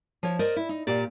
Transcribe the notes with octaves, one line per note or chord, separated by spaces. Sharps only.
F3 C#5
A#4 C5 D5 D#5
E4
D#4
A#2 G4 D5